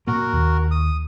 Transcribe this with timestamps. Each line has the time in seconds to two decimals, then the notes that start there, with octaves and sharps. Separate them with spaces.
0.07 A#2 A#3 F#4 A#4
0.33 D#2
0.71 D#6